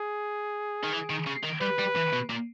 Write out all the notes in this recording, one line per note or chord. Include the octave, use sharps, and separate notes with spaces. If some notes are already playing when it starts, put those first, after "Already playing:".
Already playing: G#4
D#3
E3
D#3
C#3
D#3
G3 B4
G3
E3
B2
A#2